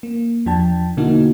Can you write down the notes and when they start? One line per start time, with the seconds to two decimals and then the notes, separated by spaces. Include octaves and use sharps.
0.03 A#3
0.46 E2 F3 D4 G5 A5
0.97 B2 D3 A#3 D#4 E4 F#4